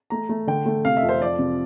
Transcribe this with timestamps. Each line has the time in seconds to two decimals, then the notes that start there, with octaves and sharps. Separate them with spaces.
0.10 A3 A#5
0.29 A3
0.47 D3 G5
0.66 A3
0.85 C3 F5
0.97 E5
1.03 F2
1.09 C5
1.21 F3 D5
1.39 C3